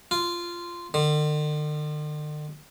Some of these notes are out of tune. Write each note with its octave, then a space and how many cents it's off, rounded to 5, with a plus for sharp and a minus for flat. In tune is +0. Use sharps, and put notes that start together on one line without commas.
F4 -10
D3 +45